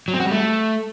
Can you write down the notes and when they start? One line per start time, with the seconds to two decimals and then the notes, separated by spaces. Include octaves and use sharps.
0.08 F#3
0.14 C4
0.20 F#4
0.25 G3
0.31 A3